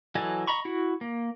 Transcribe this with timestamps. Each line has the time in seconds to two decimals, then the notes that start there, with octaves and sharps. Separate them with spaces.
0.15 E3 F#3 A4 D#5 G#5
0.47 D#5 A#5 B5 C#6
0.65 E4 F#4
1.01 A#3